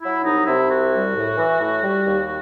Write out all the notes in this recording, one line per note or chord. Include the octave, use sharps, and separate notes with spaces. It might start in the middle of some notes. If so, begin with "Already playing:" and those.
F#3 E4
C2 D#4
C3 E4
C2 F#4
G3
A2
E3
A2
G3
D#2